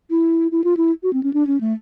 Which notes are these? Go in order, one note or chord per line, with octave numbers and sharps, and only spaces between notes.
E4
E4
F4
E4
F#4
C4
C#4
D4
C#4
A3